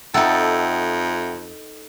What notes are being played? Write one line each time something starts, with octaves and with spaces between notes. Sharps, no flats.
F2 D#4 A4 E5 F#5 G5